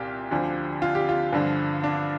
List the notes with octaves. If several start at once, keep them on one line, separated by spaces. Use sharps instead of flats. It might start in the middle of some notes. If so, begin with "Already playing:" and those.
Already playing: C2 A#2 F4 G4
D2 D3 F3
F4
G4
F4
G2 D3 F3
D4